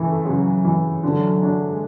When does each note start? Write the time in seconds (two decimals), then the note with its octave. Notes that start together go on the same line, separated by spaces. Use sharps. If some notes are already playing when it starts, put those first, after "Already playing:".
Already playing: C#3 E3 A3
0.25 C#3 F#3
0.65 E3
1.03 D3
1.42 D4
1.72 G#3